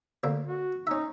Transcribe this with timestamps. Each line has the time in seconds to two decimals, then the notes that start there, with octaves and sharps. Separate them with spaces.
0.23 D2 D3 A#3
0.45 F#4
0.87 C#4 D#4 E5